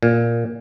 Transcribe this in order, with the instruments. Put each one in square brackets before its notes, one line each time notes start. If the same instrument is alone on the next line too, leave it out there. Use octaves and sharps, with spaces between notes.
[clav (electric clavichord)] A#2